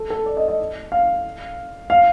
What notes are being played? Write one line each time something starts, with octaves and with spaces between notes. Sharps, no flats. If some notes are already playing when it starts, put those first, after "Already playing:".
Already playing: A4
A4
D5
D#5
D#5
F5
F5